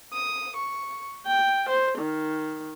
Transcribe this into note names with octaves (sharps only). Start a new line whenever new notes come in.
D#6
C#6
G5
C5
D#3